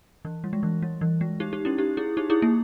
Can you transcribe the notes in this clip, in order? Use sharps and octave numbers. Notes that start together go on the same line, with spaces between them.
E3
G3
G#3
E3
G3
E3
G#3
D#4 G4
D#4 G4
C#4 E4
D#4 G4
E4 G#4
D#4 G4
E4 G#4
A#3